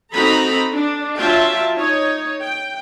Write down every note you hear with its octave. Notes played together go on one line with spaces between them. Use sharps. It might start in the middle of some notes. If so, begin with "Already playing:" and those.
C4 D#4 F#4 A4 A#5 B5
D4
F#3 F4 E5 G5 A5
D#4 C#5
G5